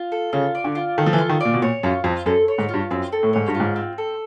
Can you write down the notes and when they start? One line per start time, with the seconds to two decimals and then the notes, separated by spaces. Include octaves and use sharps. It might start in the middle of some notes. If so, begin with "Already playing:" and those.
Already playing: F4
0.12 A4
0.33 C#3 F4
0.55 D5
0.64 D3
0.75 F4
0.98 D#3 A4
1.06 F3
1.13 E3
1.18 F4
1.29 D#3
1.40 A#2 D5
1.54 B2
1.62 A#2 C#5
1.83 F#2 F4
2.04 F2 C4
2.26 F#2 A4
2.48 C#5
2.58 G#2
2.69 F4
2.74 G2
2.91 F#2 C4
3.12 A4
3.23 A2
3.33 G#2 C#5
3.48 G2
3.55 F4
3.60 G#2
3.76 C4
3.98 A4